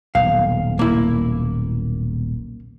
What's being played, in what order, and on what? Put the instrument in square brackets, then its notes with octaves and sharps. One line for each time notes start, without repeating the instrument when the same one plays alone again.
[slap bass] D#1 B1 [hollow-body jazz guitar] F5
[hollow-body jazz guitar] A#3 E4